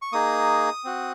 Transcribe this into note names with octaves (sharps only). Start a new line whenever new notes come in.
C#6
A#3 D#4 G#4 D#6
C4 F#4